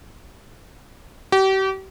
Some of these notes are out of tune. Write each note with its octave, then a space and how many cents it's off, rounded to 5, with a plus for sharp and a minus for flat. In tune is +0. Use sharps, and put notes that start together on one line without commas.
G4 -35